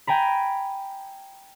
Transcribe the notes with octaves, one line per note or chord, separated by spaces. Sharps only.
G5 G#5 A#5 B5